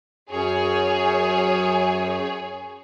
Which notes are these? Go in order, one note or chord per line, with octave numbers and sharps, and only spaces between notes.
F#2 G#4 C#5